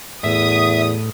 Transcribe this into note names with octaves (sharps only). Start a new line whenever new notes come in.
E2 A2 E5 D#6